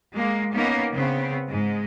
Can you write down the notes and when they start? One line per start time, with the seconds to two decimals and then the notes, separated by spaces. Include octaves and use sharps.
0.14 G#3 A#3
0.53 A#3 B3 C#4 D#4
0.91 C#3 B3 C4
1.49 G#2 G#3